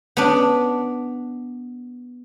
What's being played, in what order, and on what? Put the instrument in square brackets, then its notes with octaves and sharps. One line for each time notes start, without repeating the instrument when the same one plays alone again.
[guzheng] B3 D4